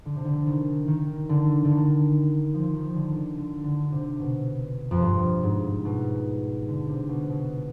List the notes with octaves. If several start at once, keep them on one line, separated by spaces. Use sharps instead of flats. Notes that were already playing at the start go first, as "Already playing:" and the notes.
D3
C3
D3
D#3
D#3
D3
D3
D#3
F3
D#3
D3
D3
D3
D3
C3
B2
F2
G2
G#2
B2
D3
C3
B2
B2